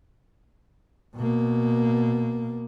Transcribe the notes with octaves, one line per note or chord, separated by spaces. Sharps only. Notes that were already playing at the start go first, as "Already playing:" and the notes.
B2 A#3